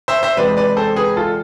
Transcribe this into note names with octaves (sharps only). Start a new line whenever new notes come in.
C5 E5
C5 E5
E2 C3 G#3 B4 D5
B4 D5
A4 C5
G#4 B4
F4 A4